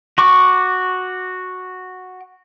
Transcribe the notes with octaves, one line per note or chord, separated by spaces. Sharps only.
F#4 C#6 D6